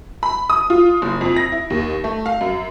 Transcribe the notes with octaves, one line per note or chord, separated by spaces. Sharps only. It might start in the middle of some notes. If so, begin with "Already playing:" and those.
B5
D#6
F4
F#1
F2
A#6
E4
D#2
A3
F5
F#2